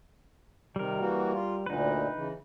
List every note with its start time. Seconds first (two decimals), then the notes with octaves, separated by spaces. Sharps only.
0.76 C3 D#3 G3 A#4
1.00 E3 A#3 F#4
1.34 F4
1.66 D2 A#2 D3 D#4 B4
2.16 C#3 E3